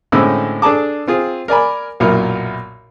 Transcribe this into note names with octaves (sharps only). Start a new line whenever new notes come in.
A2 D3 G#3 C4 C#4 E6
D4 G#4 A4 A5 D6
C4 F4 G#4
A#4 D5 G#5 B5
B1 F#2 A#2 E4 F4 A#4